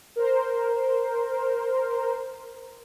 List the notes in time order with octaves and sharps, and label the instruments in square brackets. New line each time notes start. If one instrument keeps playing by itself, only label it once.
[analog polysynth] A#4 C5